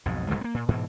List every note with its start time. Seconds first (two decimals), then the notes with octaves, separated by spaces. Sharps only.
0.06 B1 F2 G#2
0.29 B1 E2 G#2 G3
0.41 A#3 B3
0.54 A#2
0.68 G#2 B2 E3